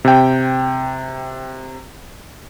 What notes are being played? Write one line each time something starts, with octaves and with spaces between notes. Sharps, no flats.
C3 G5